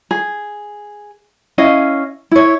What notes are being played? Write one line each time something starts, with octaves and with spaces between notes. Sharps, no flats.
G#4
C#4 E4 D#5 F5
E4 C#5